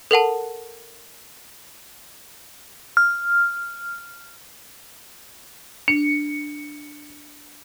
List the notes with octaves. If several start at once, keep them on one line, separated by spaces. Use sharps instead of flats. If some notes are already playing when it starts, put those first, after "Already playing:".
A4 A#4 F#5 A5
F6
D4 C#7